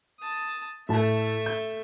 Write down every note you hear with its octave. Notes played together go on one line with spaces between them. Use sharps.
A5 D#6
A2 A3 E5 A5
G6